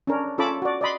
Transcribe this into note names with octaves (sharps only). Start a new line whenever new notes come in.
C#4 D4 A#4
C#4 F4 A4 A5 B5 D6
F#4 D5
D5 D#5 B5 C6